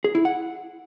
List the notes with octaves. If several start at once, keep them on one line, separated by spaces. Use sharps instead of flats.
G#4
E4
F#5